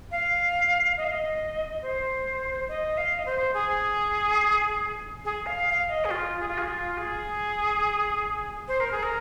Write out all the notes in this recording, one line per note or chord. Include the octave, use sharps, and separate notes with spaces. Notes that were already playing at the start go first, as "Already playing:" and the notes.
F5
D#5
F5
D#5
C5
D#5
F5
D#5
C5
G#4
G#4
F5
F5
D#5
G#4
F4
G#4
F4
G#4
F4
G#4
C5
A#4
G#4
A#4